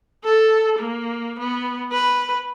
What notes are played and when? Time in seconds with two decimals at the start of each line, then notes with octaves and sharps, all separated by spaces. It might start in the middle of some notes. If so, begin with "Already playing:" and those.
0.25 A4
0.79 A#3
1.39 B3
1.92 B4